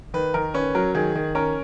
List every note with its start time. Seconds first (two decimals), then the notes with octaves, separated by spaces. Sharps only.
0.14 D#3 B4
0.34 D#3 A#4
0.54 C#4 B4
0.75 F#3 A#4
0.95 D#3 G#4
1.15 D#3
1.35 C#4 A#4